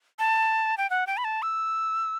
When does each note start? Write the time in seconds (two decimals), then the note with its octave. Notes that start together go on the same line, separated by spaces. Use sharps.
0.19 A5
0.78 G5
0.90 F#5
1.07 G5
1.17 B5
1.24 A5
1.42 E6